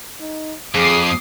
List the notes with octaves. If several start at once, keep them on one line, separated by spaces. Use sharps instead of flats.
D#4
F2 G#4 D6 D#6 C7